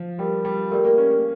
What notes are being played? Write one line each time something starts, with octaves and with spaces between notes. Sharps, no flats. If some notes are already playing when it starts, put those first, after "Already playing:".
Already playing: F3
G3 G4 A#4 D5 G5
G3
A3 G4 A#4 D5 G5
A#3
C#4
A#3